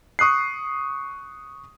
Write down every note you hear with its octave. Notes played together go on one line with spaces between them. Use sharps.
C#6 D#6 F#6 C7